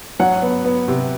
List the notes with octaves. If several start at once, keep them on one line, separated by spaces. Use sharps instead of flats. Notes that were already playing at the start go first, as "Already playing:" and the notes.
F#3 F#5
B3
B3
C3